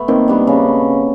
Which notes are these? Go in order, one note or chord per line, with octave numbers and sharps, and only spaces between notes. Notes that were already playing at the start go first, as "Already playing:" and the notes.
Already playing: A3 B3
D#3 A#3 C4
G3 B3 D4
C#3